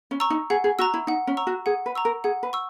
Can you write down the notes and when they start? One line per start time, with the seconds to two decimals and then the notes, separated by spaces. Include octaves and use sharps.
0.11 C#4
0.20 A#5 C#6 E6
0.30 D#4
0.50 G#4 F#5
0.64 G#4
0.79 F#4 A#5 C#6 E6
0.94 E4
1.07 D#4 F#5
1.27 C#4
1.37 A#5 C#6 E6
1.47 F#4
1.66 G#4 F#5
1.86 B4
1.95 A#5 C#6 E6
2.05 A#4
2.24 G#4 F#5
2.43 B4
2.53 C#6 E6